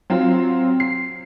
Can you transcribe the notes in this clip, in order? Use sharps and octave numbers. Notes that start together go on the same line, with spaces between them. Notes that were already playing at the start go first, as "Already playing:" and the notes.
F#3 C4 F4
C7